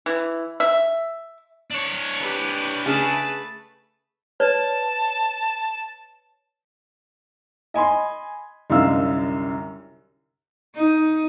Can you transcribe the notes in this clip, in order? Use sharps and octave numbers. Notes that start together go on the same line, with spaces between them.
E3
E5
D4 C#5
G4 B4
C#3 A3 G#4 B4 A5
B4 C#5 D5 A5
D#5 G#5 B5 C6
C2 F#2 D3 D#4 F5 E6
D#4